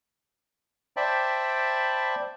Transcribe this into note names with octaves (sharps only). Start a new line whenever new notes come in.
C5 D5 E5 G5 A5 B5